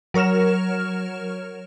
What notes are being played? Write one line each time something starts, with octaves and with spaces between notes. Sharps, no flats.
F#3 A#4 C#5 F6 E7